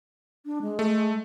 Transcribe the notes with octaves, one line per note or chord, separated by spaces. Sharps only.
D4
G#3
A3